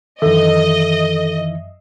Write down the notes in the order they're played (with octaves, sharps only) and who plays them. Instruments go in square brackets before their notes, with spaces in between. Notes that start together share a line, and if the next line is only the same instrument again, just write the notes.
[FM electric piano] F#2 E5 [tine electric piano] D#3 E3 [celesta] A4 [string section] D#5